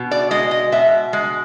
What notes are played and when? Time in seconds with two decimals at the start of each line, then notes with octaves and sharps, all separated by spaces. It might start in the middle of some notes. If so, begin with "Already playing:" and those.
Already playing: B2
0.11 D5
0.31 G#3 D#5
0.51 D#5
0.72 B2 E5
1.13 G#3